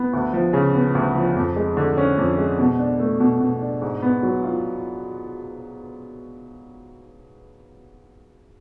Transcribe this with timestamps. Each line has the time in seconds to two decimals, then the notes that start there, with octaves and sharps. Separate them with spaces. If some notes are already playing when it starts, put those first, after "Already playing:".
Already playing: B3
0.13 D2
0.33 F3
0.53 C#3
0.74 B3
0.95 D2
1.15 F3
1.36 F2
1.56 G#3
1.77 D3
1.97 C#4
2.18 F2
2.38 G#3
2.59 B2
2.79 D4
2.99 A3
3.20 B2
3.40 B2
3.61 D4
3.81 G#2
4.02 B3
4.23 F#3
4.44 F4